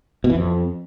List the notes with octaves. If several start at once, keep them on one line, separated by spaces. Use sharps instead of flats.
B2
E3
F2